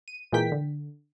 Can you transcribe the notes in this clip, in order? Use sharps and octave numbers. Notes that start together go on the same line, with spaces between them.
D#7
A#2 E3 G#3 A#3 G5 B6
D3